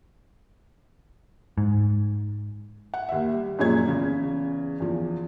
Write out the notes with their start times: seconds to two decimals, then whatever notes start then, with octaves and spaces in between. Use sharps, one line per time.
1.58 G#2
2.94 F#5
3.09 D#2 E5
3.32 G3
3.59 F#2 A#2 F3 G#3 C#5 G#6
3.86 E2 C#3
4.80 E2 F3